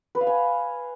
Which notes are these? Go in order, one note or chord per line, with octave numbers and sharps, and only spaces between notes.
B4
F5
G#5